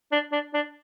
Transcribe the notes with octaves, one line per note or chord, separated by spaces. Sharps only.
D4
D4
D4